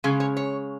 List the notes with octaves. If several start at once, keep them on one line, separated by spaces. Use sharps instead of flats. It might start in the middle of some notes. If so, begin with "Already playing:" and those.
C#3 G#3 C#4 G#4
C#5
C#5